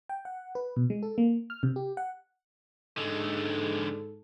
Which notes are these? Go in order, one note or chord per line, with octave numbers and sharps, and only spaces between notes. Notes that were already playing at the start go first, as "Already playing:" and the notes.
G5
F#5
B4
B2
G#3
A4
A#3
F6
C3
G4
F#5
G#2 D3 G#3 A4